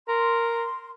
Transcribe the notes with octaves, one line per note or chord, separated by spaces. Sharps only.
A#4 C6